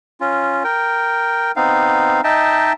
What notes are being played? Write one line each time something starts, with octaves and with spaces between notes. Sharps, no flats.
C#4 F4
A#4 G5
B3 C4 D#4 F5
D#4 D#5 E5 G5 A5